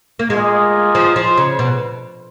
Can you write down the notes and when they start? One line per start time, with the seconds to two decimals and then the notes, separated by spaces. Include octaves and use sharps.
0.19 A#3
0.30 G#3 A#3 F4 G#4 D#5
0.95 F3
1.16 F3
1.37 C#3
1.59 B2